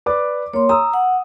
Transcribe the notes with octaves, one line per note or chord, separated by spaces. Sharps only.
B4 D5 D6
A#3 C#5 C6
A#5 D#6 E6
F#5